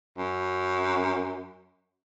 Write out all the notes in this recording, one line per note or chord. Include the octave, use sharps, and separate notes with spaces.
F#2